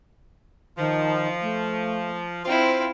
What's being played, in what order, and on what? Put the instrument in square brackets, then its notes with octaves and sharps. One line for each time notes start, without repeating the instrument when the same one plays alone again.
[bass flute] D#3 [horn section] F3
[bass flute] A3
[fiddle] C4 E4 [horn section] F4 [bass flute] C5